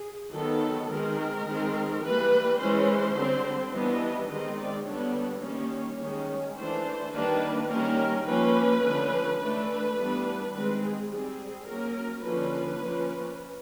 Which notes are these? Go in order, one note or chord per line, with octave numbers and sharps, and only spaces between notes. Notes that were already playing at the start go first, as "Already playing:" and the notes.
Already playing: G#4
D#3 F#3 B3 A4
D#3 G#3 C4 A#4
D#3 G#3 C4
E3 G3 A#3 B4
E3 G#3 C#4 C5
D3 G3 C4
E3 G3 B3 D4 D#5
D#3 G#3 C4 D#5
D5
D3 G3 B3 D4 C#5
D#3 G3 A#3 C#4
D#3 G#3 C#4
E3 A3 D4 C5
D#3 G3 A#3 D4 B4
D#3 G3 A#3 C#4 A#4
F3 A#3 C#4 B4
D3 F3 A3 C#4
E3 A3 D4 B4
E3 G3 B3 D4
D#3 G#3 C4 B4
G#4
G3 C4 G#4
F#3 A#3 C#4 A#4
D3 F3 A#3 C#4 B4
F3 A#3 C#4